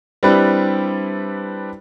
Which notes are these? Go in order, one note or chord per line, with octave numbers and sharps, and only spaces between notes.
G3 C4 D4 E4 G4 B4